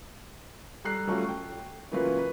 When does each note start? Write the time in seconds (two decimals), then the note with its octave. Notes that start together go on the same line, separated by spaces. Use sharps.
0.84 G3 A4 A#5 F#6 C7
1.07 F#3 G3 A3 C#4 F4 F#4
1.29 G5
1.92 C#3 E3 F#3 A#3 F4 B4
2.19 B4